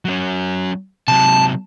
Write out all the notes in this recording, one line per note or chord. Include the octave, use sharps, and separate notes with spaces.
F#3 C#4
C3 F#3 A5